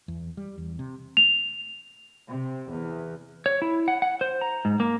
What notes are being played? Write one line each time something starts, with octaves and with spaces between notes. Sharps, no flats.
E2
G3
E2
C3
F7
C3
E2
C#5
E4
F#5
F#5
C5
A#5
G#2
A#3